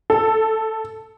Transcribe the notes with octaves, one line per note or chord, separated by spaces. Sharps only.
A4